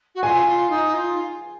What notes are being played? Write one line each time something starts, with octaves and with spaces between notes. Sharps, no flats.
F#4
F4 G#5
F4
D#4
F4